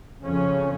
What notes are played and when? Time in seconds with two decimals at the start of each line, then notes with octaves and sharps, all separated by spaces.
0.23 F2 C#3 C#4